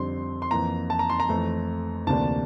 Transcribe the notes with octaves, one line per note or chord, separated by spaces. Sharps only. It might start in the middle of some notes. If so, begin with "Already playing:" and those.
Already playing: F2 D3 G3 C4 C6
C6
F2 E3 A#3 A#5
A5
A#5
C6
A#5
F2 E3 A3
D2 C3 E3 A#3 D4 A5